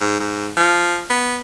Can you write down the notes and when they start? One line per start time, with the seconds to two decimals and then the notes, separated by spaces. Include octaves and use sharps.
0.01 G#2
0.20 G#2
0.57 F3
1.10 B3